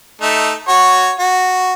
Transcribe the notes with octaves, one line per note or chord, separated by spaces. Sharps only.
A3 D#4
F#4 C#5
F#4